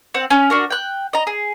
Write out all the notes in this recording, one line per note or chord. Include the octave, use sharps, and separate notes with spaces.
C4 F#5
C#4
D4 F#4 A#4
G5 F#6
D#5 A#5
G#4